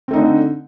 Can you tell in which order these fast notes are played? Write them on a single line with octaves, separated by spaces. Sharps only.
C4 A3 D#4 D3